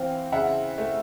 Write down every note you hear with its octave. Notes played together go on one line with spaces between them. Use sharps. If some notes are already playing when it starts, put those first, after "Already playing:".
Already playing: E3 C4 F5 G5
C#3 E5 F#5
A3